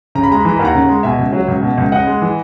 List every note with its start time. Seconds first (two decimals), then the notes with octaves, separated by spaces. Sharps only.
0.15 C#3 A#5
0.24 B5
0.31 G#3 A#5
0.41 B5
0.45 E3 A#5
0.57 D#2 B5
0.65 F#5 A#5
0.75 C#3
0.89 G#3
1.03 B2 E5 G#5
1.18 C#2
1.33 F#3
1.48 C#2
1.62 B2
1.78 C#2
1.92 C#3 D#5 F#5
2.07 G#3
2.22 E3